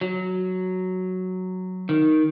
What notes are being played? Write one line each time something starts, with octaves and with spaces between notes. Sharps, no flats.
F#3
D#3